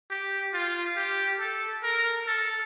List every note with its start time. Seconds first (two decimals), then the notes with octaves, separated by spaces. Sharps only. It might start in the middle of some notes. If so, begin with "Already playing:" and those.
0.10 G4
0.54 F4
0.96 G4
1.39 A4
1.83 A#4
2.27 A4